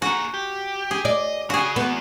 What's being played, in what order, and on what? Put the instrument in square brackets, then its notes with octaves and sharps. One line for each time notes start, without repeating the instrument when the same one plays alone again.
[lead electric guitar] A#3 G#4 [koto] F#4
[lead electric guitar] G4
[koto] G#4
[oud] D5 [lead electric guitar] D#5
[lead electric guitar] C#3 C#4 [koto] F#4 G#4
[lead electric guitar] E2 E3 [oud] B3